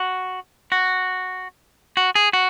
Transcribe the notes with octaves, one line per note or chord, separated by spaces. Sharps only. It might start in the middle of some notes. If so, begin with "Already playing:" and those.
Already playing: F#4
F#4
F#4
G#4
F#4